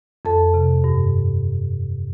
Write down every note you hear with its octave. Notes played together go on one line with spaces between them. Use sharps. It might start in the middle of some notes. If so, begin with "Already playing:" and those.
F2 A4 A5
C3
G2